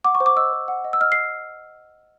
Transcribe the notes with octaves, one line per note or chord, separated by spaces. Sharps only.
F#5 D6
C#6
C5
D6
D#5 E6
C5
F#5
D#5
E6
D#5 F6
C7